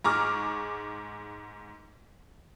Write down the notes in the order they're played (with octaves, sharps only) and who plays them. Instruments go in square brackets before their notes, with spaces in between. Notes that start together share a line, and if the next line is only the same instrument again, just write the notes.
[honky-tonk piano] G#2 G#4 A#5 C#6 D6 F6